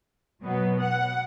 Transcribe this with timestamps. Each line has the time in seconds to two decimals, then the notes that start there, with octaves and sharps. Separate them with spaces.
0.42 B2 F#3 B3
0.80 F#5